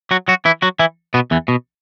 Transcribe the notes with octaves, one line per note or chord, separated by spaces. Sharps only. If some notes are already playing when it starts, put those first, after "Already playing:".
F#3 F#4
F#3 F#4
E3 E4
F#3 F#4
E3 E4
B2 B3
E2 E3
B2